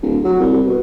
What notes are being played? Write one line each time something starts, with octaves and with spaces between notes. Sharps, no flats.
D1
F#3
C2
B2